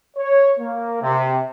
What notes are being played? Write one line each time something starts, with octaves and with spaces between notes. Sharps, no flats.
C#5
A#3
C3